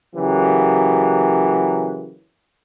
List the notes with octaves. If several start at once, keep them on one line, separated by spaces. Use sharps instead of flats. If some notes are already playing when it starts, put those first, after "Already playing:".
C#3 E3 F#3 A#3 G4